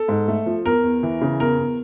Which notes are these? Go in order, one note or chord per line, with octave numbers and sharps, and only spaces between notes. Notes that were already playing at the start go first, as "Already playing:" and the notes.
Already playing: A4
G#2
A3
F3
E2 A#4
E2
E3
C#3
E2 A#4
E2